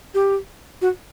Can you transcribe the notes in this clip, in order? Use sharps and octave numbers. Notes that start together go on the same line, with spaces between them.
G4
F#4